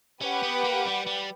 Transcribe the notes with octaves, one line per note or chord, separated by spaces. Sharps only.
C#4 G4 B4 F#5
B3
A#3
G3
G3